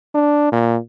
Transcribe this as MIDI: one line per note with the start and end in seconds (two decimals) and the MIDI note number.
0.14 0.47 62
0.52 0.78 46